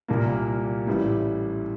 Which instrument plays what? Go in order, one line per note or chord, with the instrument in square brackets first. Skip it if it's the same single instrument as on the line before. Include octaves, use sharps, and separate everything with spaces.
[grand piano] C2 A#2 G3 A#3
A1 A2 G3